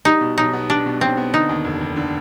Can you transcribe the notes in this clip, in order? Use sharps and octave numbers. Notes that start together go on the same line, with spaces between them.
G3 D#4
B2
B1 D#4
B3
G3 D4
B2
B1 C4
B3
D3 D#4
D#2
F1
F1
D3